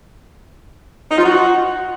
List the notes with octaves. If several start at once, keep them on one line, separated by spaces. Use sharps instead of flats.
D#4
F4
F#4